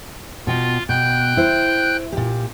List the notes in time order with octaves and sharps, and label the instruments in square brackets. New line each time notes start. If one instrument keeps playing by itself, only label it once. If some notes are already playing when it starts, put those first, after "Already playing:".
[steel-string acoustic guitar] B2 G5 [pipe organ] F4
[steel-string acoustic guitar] B2 [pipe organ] G5 F#6 G6
[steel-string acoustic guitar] E4 C5
A#2 G4